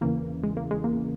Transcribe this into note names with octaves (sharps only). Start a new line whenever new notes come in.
E2 C#3 E3 A#3
G#3
A#3
G#3
A#3